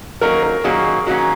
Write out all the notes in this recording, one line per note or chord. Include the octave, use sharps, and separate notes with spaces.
D#3 F#3 A#3 C#4 A#4
A#4
D#3 F#3 A#3 C#4 G#4
D#3 F#3 A#3 C#4 F#4